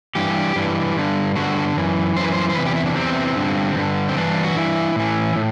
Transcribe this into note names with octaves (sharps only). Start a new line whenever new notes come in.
G2 E3 G4
G2 E3
G2 D3
G2 D3 F#4
F#2 E3
F#2 E3 B4 C5
C5
C5
E2 C3 E3 B4
G4
E4
D4
E2 C3 E3 C4
G2 D3
G2 D3
C4
G2 E3 D4
F#4
G2 E3 E4
A2 E3
A2